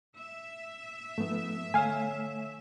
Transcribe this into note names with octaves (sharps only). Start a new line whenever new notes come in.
E5
G#2 F3 A3 B3
D3 A3 C#5 F5 G#5